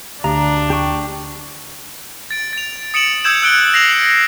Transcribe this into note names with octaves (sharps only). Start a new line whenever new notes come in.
D2 D3 D4 A#5
G4 G5 C#6
A6 D7
A6 F7
D#6 C#7 D7 E7 F#7
D#6 E6 G6 G#6 E7
E6 F#6 D7 G7
A#6 C7 F7 F#7